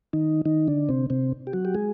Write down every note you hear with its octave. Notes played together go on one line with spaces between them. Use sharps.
D#3 D#4
D#3 D#4
D3 D4
C3 C4
C3 C4
G4
F#3 F#4
G4
G#3 G#4